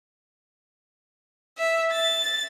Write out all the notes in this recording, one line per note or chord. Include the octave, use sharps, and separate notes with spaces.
E5
A6